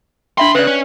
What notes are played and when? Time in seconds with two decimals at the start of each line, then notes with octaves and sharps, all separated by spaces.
0.38 E3 D4 E5 G5 B5 C6
0.55 C#3 B4 D5 F#6
0.67 C#4